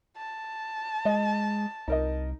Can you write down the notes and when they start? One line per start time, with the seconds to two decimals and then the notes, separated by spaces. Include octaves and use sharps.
0.17 A5
1.05 G#3 D#5
1.88 C2 D#4 A#4 D#5